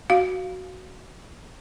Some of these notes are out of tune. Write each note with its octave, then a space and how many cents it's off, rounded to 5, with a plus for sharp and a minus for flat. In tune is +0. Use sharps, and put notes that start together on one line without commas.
F#4 +0 F5 +0